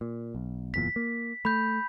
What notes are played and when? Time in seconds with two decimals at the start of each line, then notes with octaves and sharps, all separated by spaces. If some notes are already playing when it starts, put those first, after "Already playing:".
0.01 A#2
0.35 B1
0.74 F#1 E2 A#2 B6
0.96 A#3
1.45 A3 B5 G6